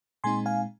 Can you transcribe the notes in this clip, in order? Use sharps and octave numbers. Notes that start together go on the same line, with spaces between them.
A#2 G#3 C4 D#4 G#5 C6
F5 G#5